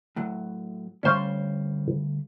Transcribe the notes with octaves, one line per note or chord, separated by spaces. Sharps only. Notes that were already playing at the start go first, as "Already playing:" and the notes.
A2 F#3
D2 G3 C#4 C5 F5